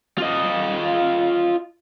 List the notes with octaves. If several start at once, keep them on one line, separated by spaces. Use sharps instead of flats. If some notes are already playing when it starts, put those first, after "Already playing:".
F4 D#5